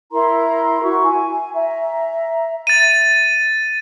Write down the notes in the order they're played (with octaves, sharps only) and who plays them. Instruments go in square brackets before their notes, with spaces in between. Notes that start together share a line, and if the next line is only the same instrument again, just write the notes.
[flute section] E4 A#4 A#5 C6
E4 F#4 C#6
G#5
E5 A#5
[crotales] A6 D#7